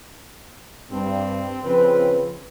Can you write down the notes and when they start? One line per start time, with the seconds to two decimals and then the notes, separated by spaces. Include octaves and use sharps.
0.91 G2 C4
1.64 C#3 F3 B4